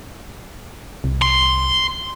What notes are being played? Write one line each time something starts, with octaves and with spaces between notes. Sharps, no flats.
C2
C6